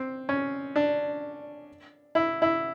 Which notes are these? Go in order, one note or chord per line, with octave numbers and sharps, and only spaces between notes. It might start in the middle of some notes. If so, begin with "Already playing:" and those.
Already playing: C4
C#4
D4
E4
E4